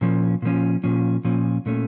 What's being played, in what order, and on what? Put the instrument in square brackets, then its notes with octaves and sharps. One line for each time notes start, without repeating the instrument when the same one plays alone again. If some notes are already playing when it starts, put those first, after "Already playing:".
[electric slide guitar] A#2 F3 C#4
A#2 F3 C#4
A#2 F3 C#4
A#2 F3 C#4
A#2 A3 C#4